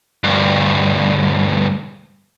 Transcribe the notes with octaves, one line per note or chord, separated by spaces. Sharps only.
D2 G2